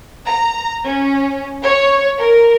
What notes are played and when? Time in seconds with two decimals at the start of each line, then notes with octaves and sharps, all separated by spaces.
0.24 A#5
0.85 C#4
1.63 C#5
2.18 A#4